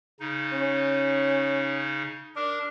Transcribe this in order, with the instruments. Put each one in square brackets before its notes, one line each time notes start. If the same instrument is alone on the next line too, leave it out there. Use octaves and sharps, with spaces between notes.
[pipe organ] C#3 D#4
[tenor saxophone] C#4
[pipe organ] D4 A#4 [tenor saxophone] D5